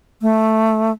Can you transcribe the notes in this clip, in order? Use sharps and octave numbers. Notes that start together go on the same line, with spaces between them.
A3